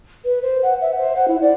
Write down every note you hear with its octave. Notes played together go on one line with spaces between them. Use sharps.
B4
C5
F#5
E5
C5
F#5
E4
D5